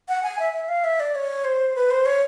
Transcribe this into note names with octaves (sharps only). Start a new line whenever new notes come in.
F#5
G#5
E5
E5
F5
E5
D5
C#5
C5
B4
C5
C#5